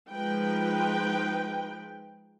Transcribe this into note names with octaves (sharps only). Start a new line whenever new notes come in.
F3 G#3 D#4 B4 G5